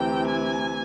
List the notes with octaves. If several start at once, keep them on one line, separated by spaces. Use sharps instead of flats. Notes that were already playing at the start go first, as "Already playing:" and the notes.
Already playing: D2 C3 E3 G5
G#5